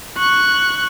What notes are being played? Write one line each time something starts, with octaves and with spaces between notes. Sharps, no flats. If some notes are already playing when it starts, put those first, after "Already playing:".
C#6 F#6